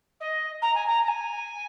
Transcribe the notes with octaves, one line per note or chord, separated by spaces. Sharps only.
D#5
A#5
G#5
A#5
A#5
G#5